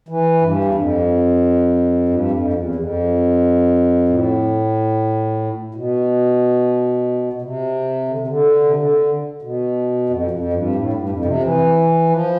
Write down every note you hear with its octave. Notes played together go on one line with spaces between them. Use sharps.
E3
G2
E2
F2
G2
F2
E2
F2
A2
B2
B2
C3
D3
C3
D3
C3
D3
B2
F2
F2
G2
A2
G2
F2
C3
E3
F3